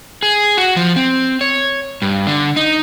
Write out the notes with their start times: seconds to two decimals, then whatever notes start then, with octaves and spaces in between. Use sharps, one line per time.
0.23 G#4
0.57 F#4
0.76 F3
0.96 C4
1.41 C#5
2.02 G2
2.27 D3
2.56 D#4